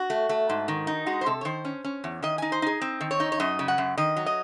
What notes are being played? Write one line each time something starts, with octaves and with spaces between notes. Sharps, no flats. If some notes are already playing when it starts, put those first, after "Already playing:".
Already playing: F#4
A3
A3
G#2
D#3
D#4
G#3 F#4
C5
C3 A4
C#5
D#3 C5
C#4
C#4
E2
D#3 D#5
D#4 G#5
C5
D#4 G#4
C4
D#3
C#5
D#4
C#5
F#2 D#5
C#3
F#5
F#2
D#3 D#5
F#3
D#5